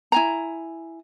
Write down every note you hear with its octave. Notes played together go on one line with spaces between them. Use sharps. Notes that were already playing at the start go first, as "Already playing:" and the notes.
E4 G#5 A#5